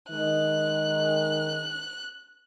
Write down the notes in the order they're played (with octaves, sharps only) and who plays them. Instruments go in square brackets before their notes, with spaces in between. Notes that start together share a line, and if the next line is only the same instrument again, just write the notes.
[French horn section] D#3 G#3 D#5 [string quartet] F#6